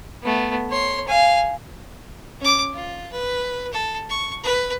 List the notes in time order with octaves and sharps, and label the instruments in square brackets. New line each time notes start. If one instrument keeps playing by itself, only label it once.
[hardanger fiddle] A3 B3
C#5 C6
F5 G#5
[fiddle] C#4 D6
F4
B4
A4
C#6
B4